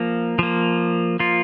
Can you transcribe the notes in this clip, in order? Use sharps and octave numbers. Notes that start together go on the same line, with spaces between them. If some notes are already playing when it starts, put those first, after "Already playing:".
Already playing: F3 A#3
F3 A#3
F3 A#3 F4